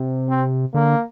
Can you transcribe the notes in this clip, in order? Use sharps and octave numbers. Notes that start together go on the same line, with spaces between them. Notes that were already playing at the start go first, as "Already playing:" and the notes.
Already playing: C3
C4
D3 A#3